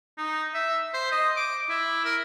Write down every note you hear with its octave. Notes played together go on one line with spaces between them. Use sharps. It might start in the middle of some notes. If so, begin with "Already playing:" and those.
D#4
E5
C5
D#5
D6
E4
A#4